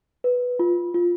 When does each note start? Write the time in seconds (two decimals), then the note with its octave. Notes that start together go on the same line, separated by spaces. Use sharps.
0.24 B4
0.59 F4
0.94 F4